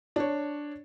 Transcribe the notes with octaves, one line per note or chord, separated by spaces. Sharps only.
D4 C#5